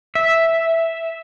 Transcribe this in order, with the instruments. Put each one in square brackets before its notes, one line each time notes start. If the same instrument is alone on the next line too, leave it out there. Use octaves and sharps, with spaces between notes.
[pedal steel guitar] E5